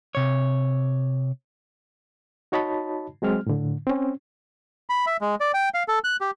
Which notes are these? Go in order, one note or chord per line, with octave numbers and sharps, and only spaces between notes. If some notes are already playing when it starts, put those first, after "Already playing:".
C3 C#5
D#4 F#4 C#5 D#5 A5 B5
F#3 G#3 C4 F6
A2 D3
C4 C#4
B5
E5
G#3
D5
G5
F5
A4
F#6
G4